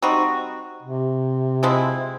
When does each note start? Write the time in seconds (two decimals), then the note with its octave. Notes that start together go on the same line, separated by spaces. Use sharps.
0.02 G3 C4 D#4 F#4
0.83 C3
1.63 F3 G#3 C4 E4